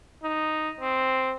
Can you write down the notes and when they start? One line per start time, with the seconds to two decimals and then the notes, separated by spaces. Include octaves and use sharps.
0.23 D#4
0.81 C4